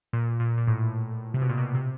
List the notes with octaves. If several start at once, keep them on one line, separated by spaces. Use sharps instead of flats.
A#2
A#2
A#2
A2
C3
B2
A#2
B2
C3